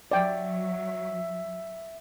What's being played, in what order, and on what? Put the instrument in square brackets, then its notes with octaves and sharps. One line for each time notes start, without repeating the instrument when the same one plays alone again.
[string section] F#3 [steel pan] D5 G5 [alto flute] E5